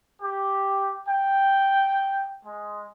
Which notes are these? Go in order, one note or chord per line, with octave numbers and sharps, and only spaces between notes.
G4
G5
G#3